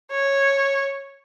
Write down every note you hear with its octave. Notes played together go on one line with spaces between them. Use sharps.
C#5